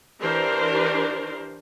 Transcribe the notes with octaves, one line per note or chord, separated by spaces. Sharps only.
E3 D4 G4 A#4 C5